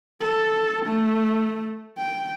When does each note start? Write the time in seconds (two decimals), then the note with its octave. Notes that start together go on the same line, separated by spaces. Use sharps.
0.21 A4
0.86 A3
1.98 G5